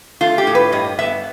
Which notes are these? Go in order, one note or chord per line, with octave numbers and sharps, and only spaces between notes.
A3 F4
G4
A2
B4
G2 D#5
B3 E5